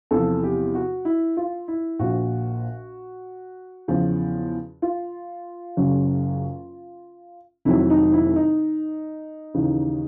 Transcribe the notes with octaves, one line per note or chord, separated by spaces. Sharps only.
E2 C3 F3 A4
G4
F#4
E4
F4
E4
A#1 A#2 F3 F#4
E2 C#3 F3
F4
F#1 F#2 C#3 F#3
F1 F2 C3 D#3 F#3 E4
D#4
E4
D#4
D#2 C#3 E3